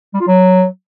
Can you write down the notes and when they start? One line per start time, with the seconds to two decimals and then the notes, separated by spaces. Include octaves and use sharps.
0.14 G3
0.21 F4
0.27 F#3